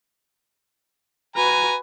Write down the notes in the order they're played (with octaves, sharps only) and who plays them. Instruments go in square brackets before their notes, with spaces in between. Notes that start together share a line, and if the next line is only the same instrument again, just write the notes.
[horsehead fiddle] F#4 B4 [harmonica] G#5 A#5